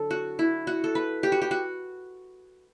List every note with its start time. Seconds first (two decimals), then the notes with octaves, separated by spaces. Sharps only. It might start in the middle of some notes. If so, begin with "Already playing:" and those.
Already playing: D3 F#3 A4
0.11 F#4
0.39 E4
0.67 F#4
0.84 A4
0.95 B4
1.23 G4
1.32 F#4
1.42 G4
1.51 F#4